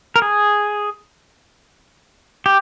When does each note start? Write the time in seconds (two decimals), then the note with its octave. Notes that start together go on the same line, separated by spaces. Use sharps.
0.16 A#4
0.22 G#4
2.46 G4